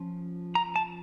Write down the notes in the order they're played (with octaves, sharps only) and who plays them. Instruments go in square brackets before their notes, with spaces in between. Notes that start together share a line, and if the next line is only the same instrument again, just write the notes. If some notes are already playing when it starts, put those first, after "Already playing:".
Already playing: [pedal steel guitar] F3 C#4
A#5
A5